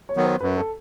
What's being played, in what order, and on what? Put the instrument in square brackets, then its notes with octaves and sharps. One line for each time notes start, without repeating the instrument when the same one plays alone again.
[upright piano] C#5
[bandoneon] D#3 F#3 B3
[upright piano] C5
[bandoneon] F#2 [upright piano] B4
[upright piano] A4